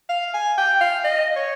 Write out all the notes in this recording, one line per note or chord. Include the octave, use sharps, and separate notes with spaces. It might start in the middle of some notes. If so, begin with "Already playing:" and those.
F5
G#5
G5
F5
D#5
C#5